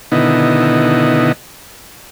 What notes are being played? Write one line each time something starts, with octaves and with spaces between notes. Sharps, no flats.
B2 D3 D#3 B3 E4 D#5